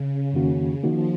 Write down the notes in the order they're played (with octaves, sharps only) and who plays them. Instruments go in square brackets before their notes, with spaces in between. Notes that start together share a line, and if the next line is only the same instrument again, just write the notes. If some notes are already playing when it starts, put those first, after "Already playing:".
Already playing: [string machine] C#3
[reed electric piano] F2 D#3 A#3 C#4 F#4
[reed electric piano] D#3 A#3 D#4 F#4 [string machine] F3